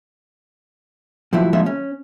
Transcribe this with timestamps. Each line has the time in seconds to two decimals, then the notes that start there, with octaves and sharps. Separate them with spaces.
1.33 A2 F3 F#3 E4
1.53 A#2 D3 F3 G3 G#3 E5
1.66 C#4